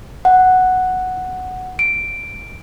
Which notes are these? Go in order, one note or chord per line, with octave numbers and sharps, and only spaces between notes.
F#5
D7